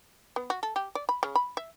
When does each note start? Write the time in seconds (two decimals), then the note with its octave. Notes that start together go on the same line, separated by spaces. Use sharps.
0.36 B3
0.50 F#4
0.63 A4
0.76 G4
0.95 D5
1.09 B5
1.23 C#3
1.35 B5
1.57 E5